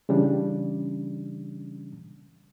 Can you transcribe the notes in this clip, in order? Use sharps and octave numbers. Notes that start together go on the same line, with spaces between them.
C#3 E3 G3 C#4 D4